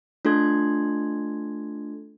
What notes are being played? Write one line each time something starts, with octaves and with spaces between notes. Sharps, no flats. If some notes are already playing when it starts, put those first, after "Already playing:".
A3 D4 F4 A4 C6 G#6